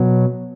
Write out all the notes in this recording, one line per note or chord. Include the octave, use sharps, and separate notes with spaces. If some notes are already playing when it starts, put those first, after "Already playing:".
Already playing: B2 F#3